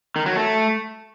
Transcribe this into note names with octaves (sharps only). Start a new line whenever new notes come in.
D#3
F#3
A3